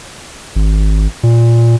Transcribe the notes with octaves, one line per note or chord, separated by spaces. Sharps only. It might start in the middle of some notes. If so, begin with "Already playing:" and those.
G#1
A#2